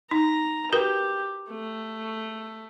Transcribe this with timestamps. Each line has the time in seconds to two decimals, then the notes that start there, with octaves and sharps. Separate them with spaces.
0.11 D#4 A#5
0.73 F#4 G4 A#4 B4
1.50 A3